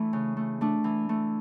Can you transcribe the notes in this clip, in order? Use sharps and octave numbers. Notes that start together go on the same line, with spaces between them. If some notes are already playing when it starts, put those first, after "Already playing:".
Already playing: E3 A3 D4
C#3
A3
A3 D4
E3
A3